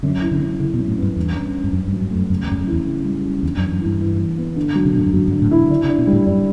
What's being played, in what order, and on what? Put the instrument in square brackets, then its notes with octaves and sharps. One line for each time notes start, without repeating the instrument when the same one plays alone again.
[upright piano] F#2 [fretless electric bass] D3
[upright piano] E4
[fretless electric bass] D3
[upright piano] F#2
[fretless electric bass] C#3 [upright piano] E4
[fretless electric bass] B2
[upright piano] F#2
[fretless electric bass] A2
[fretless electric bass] G2 [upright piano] B3
[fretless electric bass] E2 [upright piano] G2
[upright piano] C#4
C#4
[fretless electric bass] G2
[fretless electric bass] F#2 [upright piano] C#4
[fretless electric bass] G2
[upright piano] F#3
[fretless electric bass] G2
[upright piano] A3
[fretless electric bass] F#2
[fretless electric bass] F#2 [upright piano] C#3
[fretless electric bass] E2
[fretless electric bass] G2 [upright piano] C#4
[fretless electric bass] F#2
[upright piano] E4
[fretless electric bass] E2
[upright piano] C#3
G3
C#4
[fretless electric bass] E2 [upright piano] G2
[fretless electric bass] F#2
[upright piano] E3
[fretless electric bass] F#2
[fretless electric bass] G2 [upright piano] E4
[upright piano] E3
E3
B3
D3
F#3
[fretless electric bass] C#3
B2
[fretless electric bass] A2 [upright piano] D3
[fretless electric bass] G2
[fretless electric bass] F#2 [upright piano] F#3
[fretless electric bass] G2
[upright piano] D3
[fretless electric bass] A2
[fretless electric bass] B2 [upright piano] E4
[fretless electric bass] D3 [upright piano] D4
[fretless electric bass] C#3
[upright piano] D4
[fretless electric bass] B2
[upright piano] G3
[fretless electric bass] A2
[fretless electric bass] F#2 [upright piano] D4